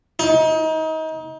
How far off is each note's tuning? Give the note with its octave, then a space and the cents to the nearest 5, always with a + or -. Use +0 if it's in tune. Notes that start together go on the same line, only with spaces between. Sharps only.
D#4 +30